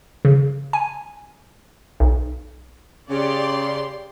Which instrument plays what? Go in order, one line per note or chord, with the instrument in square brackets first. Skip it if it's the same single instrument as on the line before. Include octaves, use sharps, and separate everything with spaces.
[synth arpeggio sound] C#3
G#5
B1
[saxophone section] C#3 [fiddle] G4 C6 [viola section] D5